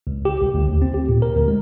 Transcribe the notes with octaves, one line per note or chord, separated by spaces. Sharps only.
C#2
G4
C2
D2
D#2
C4
G4
A#2
A#4
D2
G#3